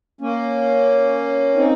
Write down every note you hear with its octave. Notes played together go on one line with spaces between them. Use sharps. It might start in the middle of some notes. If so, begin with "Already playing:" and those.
A#3 C#4
C4 D#4